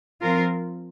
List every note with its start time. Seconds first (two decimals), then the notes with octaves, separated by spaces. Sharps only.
0.21 F3 C4 F4 A#4